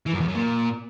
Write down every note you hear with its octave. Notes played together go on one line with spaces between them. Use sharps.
E3
F#2
E2
F#2
A#2